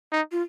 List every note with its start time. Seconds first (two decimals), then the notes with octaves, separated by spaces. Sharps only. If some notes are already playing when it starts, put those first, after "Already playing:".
0.12 D#4
0.32 F4